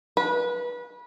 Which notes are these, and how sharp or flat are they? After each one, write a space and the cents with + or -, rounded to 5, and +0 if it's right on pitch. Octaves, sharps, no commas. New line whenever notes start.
B4 -25